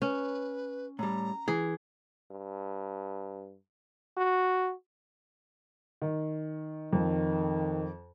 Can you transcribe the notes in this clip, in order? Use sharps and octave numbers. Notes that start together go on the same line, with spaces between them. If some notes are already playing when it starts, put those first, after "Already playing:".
C#4 B4
A2 G3 A#5
E3 G#4
G2
F#4
D#3
F2 D#3